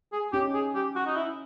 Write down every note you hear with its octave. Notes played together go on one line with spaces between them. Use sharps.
G#4
C#4 D#4 G4
G#4
G4
F#4
D#4
E4